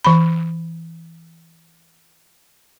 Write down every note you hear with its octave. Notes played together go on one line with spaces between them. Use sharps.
E3 B5